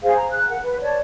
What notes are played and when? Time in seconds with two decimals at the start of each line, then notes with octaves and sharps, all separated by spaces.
0.03 G#4 C5 F5
0.17 A#5
0.32 F#6
0.48 A#4 F#5
0.63 B4
0.81 C#5 D5 A5